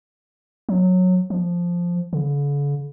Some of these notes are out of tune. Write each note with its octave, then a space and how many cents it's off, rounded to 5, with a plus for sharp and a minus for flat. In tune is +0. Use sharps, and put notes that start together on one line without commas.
F#3 -15
F3 +0
D3 -45